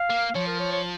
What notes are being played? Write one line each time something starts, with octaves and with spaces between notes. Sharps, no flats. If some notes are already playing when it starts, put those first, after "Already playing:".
Already playing: F5
A#3
F3 C#5
A#4
C#5
C#5